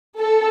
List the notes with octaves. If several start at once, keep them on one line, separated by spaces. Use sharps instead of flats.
A4